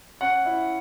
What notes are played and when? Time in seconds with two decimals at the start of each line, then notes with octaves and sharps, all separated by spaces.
0.21 C#4 F#5
0.45 E4